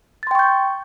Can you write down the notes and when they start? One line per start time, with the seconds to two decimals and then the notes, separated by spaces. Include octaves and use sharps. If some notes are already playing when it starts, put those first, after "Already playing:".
0.23 A6
0.27 C6
0.31 G5
0.35 C#6
0.39 G6